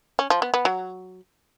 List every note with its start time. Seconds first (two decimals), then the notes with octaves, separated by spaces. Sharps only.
0.19 C#4
0.30 F3
0.42 B3
0.54 B3
0.65 F#3